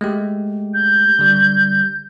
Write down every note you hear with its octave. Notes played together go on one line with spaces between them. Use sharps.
G#3 A3 G4
G6
D3 G3